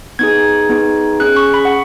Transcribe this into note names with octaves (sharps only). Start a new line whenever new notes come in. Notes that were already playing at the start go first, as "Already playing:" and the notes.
B3 D#4 G#4 G#6
B3 D#4 G#4
C#4 G#4 F#6
C#6
B5
F#5